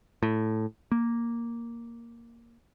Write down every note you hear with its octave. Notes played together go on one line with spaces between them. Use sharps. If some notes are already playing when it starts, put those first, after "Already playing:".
A2
A#3